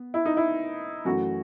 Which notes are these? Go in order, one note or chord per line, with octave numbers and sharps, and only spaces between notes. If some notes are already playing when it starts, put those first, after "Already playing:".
Already playing: B3
E4
D#4
E4
F#2 E3 A3 F#4